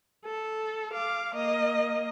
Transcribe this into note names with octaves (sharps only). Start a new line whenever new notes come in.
A4
F5 D6
A#3 D#5